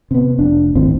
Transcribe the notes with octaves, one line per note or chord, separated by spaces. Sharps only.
C3 B3
F1 D4
G#1 D#2 A2 C4